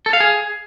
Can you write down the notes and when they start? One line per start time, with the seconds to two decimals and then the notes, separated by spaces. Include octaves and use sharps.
0.06 A4
0.13 F5
0.20 G#4